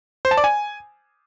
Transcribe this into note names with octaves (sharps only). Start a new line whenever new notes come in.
C5
A5
D5
G#5